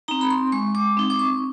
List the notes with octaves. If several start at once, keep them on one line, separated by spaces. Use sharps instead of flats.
C4 D#4 A#5
B5
C6
G#3 C#6
D6
C4 D#4
D6
C#6